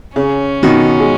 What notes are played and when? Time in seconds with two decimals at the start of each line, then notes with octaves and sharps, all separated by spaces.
0.15 C#3 C#4
0.63 B2 D#3
1.00 G#3